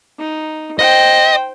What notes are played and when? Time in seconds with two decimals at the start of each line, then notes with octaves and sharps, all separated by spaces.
0.19 D#4
0.79 C5 D#5 G5